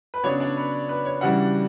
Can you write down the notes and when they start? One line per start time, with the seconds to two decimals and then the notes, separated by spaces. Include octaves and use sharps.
0.14 B4
0.24 C#3 F#3 B3 D4 C#5
0.40 D4 D5
0.57 B4
0.89 B4
1.05 C#5
1.21 C#3 E3 G3 D4 F#4 F#5